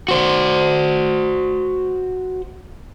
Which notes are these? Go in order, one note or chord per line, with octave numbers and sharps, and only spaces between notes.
F#4 C5